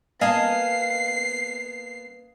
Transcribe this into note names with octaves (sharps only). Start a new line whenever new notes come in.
A#3 B3 D#5 F5 G#5 A5 C7